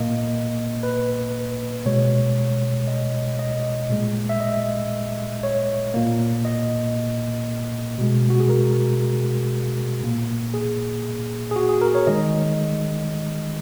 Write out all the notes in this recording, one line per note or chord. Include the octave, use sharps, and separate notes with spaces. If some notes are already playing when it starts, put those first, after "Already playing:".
Already playing: A#2 A#3 D#5
B4
B2 G#3 C#5
D#5
D#5
A#2 G#3
E5
D#5
C#5
A#2 A#3
D#5
B2 G#3
F#4
G#4
A#4
A#2 A#3
G#4
G#4
F#4
G#4
A#4
C#5
D#3 G#3 D#5